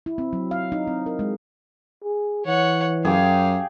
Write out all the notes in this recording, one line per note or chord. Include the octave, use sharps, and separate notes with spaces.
E4
C4
F#3
F5
D#4
C4
A#4
G#3
G#4
E3 C#5 F#5
F#2 G4 G#4 F5